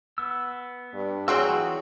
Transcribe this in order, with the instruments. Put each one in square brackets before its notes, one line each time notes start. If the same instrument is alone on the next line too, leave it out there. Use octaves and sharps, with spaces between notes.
[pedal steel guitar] B3 E6
[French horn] G2
[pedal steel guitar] E3 E6 [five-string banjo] F#3 C4 F#4 [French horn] G#4